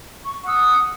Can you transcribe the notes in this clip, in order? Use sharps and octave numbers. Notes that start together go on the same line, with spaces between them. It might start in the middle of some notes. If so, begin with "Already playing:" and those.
C#6
F#5 D#6 E6